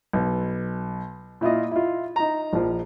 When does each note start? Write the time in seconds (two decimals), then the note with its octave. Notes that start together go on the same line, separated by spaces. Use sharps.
0.13 B1
1.41 A#2 E4 F4 D#5
1.72 E4 F4
2.16 D#4 A#5
2.53 A#1 F3